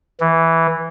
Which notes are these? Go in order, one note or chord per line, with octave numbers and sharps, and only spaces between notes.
E3